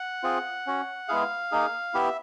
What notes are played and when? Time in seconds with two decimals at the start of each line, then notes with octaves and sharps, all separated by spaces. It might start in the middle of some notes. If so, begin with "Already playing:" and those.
Already playing: F#5
0.23 C4 F4 G#4
0.67 C#4 F#4
1.08 G#3 B3 E4 G#4 F5
1.52 A#3 D#4 G#4
1.94 B3 E4 G4 E5